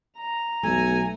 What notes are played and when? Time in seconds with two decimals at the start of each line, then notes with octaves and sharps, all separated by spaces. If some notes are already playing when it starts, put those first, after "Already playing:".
0.17 A#5
0.63 B1 A3 G#5